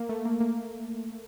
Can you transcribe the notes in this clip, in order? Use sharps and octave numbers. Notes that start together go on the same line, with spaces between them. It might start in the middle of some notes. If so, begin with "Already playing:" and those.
Already playing: A#3
A3
A#3
A#3
A#3